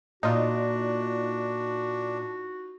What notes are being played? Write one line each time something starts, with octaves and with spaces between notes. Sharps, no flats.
A#2 D4 D#4 F4 F#4